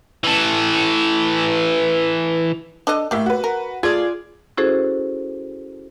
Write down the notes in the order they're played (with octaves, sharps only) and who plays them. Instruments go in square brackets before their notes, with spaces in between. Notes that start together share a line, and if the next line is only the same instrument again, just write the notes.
[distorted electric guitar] E3 A4
[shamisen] D4 A4 D#5
[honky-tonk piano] A2 E5 [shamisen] A#3 G4
[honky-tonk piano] F#4 B4
[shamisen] A#4
[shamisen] A3 [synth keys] F4 G#4 D5 [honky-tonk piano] G#6
[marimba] C#4 E4 F#4 G#4 A4 C5